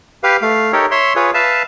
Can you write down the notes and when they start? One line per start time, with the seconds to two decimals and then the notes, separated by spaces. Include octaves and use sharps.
0.23 G4 B4 F5
0.42 A3 F5
0.73 D#4 G4 A4 A#4 C#5
0.91 C#5 E5 C6
1.16 F4 G#4 B4 C#5
1.34 B4 E5 F5 A5